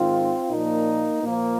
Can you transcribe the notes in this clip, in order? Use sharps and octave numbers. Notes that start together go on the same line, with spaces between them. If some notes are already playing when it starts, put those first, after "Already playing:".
Already playing: G#2 D#3 C4 F4
A#2 F3 A#3 D#4
A#2 F3 A#3